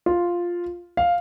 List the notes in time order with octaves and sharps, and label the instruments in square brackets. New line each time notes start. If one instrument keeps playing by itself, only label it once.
[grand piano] F4
F5